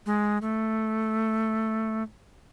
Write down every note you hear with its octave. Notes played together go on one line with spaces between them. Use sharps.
G#3
A3